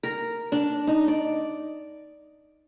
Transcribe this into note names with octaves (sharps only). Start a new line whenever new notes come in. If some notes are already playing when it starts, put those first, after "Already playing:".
A#4
D4
D#4
D5